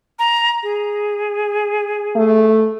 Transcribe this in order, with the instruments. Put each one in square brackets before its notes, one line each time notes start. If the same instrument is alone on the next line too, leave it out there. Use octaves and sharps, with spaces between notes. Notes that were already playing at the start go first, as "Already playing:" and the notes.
[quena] A#5
G#4
[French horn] A3